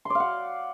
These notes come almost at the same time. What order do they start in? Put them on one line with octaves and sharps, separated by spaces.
C6 D5 F5 F#5